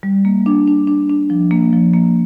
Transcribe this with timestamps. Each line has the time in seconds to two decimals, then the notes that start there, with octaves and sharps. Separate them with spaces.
0.03 G3
0.25 A#3
0.46 D4
0.68 D4
0.87 D4
1.09 D4
1.30 F3
1.51 A#3
1.73 F3
1.94 A#3